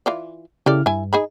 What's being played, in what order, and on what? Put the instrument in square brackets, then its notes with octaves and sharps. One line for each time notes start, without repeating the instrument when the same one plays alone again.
[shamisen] E3 F4 D5
[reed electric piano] C#3 E4 F6 [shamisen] G4 A4 D5
[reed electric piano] G2 [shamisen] E4 G#5
[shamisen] D#4 G#4 B5